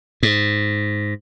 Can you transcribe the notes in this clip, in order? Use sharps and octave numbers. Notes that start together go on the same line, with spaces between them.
G#2